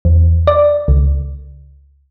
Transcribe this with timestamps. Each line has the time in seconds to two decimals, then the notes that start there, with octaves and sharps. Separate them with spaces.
0.05 E2
0.47 D5
0.88 C#2